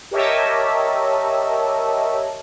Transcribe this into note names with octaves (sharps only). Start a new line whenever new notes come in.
G4 A#4 C#5 D#5 E5 A5